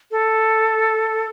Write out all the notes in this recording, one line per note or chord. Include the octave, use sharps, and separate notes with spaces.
A4